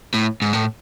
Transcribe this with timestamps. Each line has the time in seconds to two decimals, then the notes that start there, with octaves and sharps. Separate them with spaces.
0.14 A2
0.42 G#2
0.53 A2